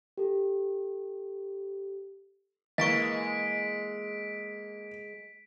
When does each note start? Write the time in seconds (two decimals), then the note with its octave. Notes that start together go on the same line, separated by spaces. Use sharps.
0.18 G4 A4
2.78 E3 G#3 A#3 D#5 A#5 C#6 B6 D7